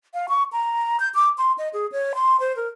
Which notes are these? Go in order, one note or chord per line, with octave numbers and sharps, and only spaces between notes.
F5
C#6
A#5
G6
D6
C6
D#5
G#4
C#5
C6
C5
A#4